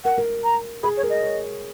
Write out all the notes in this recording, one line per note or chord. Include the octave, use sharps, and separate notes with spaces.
A#4 F#5
A#4
A#5
G#4 B5
C#5
A#4
D#5
C#5